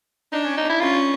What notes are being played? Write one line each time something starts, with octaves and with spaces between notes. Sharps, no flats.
D4 D#4
C#4
D#4
E4
C#4 F4